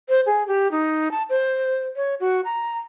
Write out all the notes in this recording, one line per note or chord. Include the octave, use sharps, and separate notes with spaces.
C5
G#4
G4
D#4
A5
C5
C#5
F#4
A#5